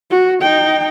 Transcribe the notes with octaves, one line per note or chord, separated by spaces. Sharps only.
F#4
D#4 G5